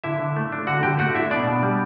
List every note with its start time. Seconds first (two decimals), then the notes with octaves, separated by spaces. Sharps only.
0.04 D3 E4 E5
0.20 D3
0.36 A3
0.52 D4
0.67 D3 F#4 F#5
0.83 D3 G4 G5
0.99 A3 F#4 F#5
1.15 D4 E4 E5
1.31 B2 D4 D5
1.47 B2
1.63 G3